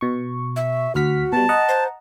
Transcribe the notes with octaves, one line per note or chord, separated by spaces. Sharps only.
B2 C#6
E5
D2 F#4 F6 B6
B2 G3 A5
D#5 F#5 A#5
C5